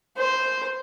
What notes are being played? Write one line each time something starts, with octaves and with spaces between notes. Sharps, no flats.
C5